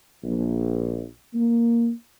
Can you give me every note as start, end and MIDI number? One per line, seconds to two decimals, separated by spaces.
0.24 1.04 34
1.33 1.90 58